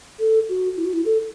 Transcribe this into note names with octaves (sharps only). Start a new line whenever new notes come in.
A4
F#4
E4
F#4
E4
A4